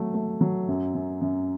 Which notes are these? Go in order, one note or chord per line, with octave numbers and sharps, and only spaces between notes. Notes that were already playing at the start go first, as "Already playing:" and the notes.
Already playing: F#3 A3
A3
F#3
F#2
F#2
F#2